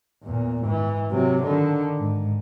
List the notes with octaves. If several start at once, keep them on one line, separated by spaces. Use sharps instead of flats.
E2 A#2
G#2 E3
C3 F#3
D3 D#3
G#2